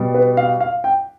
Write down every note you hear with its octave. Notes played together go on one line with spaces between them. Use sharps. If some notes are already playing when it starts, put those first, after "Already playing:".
Already playing: B2 G3
B4
F5
F5
G5